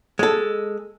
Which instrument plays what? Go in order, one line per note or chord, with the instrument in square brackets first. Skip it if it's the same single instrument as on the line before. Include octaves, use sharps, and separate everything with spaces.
[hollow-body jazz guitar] G#3 A4